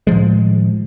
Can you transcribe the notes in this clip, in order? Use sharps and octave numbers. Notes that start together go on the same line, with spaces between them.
A2 D#3 F3 G#3